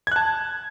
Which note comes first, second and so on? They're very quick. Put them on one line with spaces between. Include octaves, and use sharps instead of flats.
G#6 F#6 A5